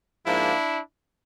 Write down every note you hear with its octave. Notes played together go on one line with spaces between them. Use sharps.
G#2 F3 A#3 D4 E4